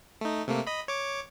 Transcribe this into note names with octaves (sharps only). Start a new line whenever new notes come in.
A3 D#4
C3 A3 A#3
D#5 B5
C#5 D6